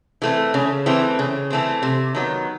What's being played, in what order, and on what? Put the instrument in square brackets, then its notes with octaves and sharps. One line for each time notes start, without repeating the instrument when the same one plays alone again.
[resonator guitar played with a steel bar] E3 A3 C4
C#3
E3 A3 C4
C#3
E3 A3 C4
C3
D#3 F#3 B3